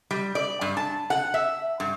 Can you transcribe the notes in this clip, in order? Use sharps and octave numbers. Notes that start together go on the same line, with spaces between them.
G3
D5
G2
A5
F#5
E5
G2